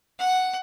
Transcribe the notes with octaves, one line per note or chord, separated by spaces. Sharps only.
F#5